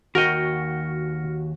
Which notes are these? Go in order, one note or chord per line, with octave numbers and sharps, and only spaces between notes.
D#2 F#4 A#4 D#5 G5 F6 A#6 C#7